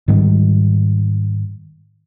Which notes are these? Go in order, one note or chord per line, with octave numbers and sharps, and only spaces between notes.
G#2 D#3 G3